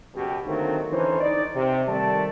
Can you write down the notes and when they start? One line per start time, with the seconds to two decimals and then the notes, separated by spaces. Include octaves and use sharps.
0.14 F#1 B2 G4
0.46 D3 D#3 F#3 A3 A#3 C4
0.92 D3 E3 C#4 D#4 A4 C5
1.21 D#4 D5
1.54 C3
1.87 D#3 G3 A3 D5 A5